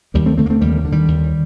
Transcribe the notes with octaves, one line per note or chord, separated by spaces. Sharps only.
D#2 G3 A#3
A3 C4
D3 A3 C4
A#3
A3 C4
D#2 G3 A#3
D#3
D3
D#3 G3
D#2